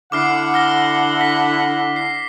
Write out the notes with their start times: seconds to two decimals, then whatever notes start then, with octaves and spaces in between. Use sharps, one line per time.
0.12 D3 E4 F#5 D6 F6 C7
0.54 F6 A#6 G7
1.21 B6
1.96 C7